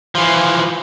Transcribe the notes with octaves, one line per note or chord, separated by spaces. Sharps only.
E3 F3